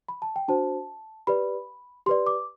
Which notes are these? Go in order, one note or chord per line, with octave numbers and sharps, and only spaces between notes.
B5
A5
G5
D4 F#4 C5 A5
G4 B4 D5 B5
G4 B4 D5 C6
D6